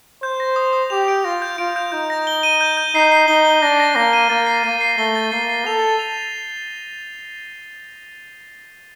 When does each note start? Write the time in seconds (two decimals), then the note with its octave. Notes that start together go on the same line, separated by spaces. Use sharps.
0.22 C5 G6
0.40 A#6
0.56 D#6
0.73 D#6
0.90 G4 F7
1.08 D7
1.24 F4 A#6
1.42 G6
1.58 F4 D7
1.76 G6
1.92 D#4 G6
2.10 A#6
2.27 G7
2.43 D#7
2.61 G6
2.77 G6
2.95 D#4 C7
3.12 C7
3.28 D#4 G7
3.45 G7
3.62 D4 A#6
3.80 A#6
3.96 A#3 A#6
4.13 D#7
4.30 A#3 A6
4.46 C7
4.64 A#3 A6
4.81 C7
4.97 A3 G7
5.15 A6
5.32 A#3 C7
5.49 C7
5.66 A4 F7
5.83 A6
5.99 F7
6.17 F7